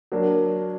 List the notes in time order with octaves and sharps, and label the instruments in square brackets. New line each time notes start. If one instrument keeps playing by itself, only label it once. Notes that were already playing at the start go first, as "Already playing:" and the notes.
[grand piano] F#3 A#3 D4